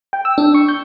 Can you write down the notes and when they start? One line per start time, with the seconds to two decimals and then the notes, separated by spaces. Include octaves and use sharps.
0.13 G5
0.25 E6
0.38 D4
0.54 C#6
0.68 G6